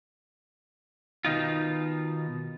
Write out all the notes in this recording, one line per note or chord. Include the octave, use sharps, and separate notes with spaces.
B2 D#3 D#4 F4